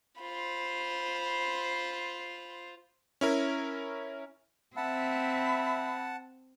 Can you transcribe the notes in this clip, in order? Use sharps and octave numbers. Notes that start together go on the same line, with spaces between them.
F4 C5 B5
C#4 E4 A#4
C4 E5 F#5 A5 B5